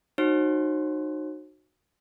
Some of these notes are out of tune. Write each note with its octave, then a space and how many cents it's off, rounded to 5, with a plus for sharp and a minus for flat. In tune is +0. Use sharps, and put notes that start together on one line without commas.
D#4 -25 F#4 -5 C5 +45